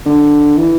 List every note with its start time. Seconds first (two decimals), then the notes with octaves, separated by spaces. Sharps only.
0.05 D3
0.57 E3